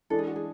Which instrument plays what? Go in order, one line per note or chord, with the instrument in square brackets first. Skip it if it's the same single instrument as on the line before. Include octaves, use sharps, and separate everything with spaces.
[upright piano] E3 G#3 D4 [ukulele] A4
[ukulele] G#4
F#4
G#4